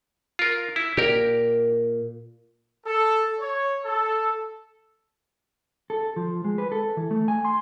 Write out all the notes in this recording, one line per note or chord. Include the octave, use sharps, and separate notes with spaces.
F4 A#4
E4
A#2 G4 A#4
A4
C#5
A4
A4
F3
G#3
B4
A4
E3
A3
G#5
C6